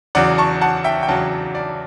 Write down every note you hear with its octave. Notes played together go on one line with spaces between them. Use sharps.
E2 C#3 F#3 D5 F#5
A5 C#6
F#5 A5
E5 G5
G5
E2 C#3 F#3 F#5 A5
D5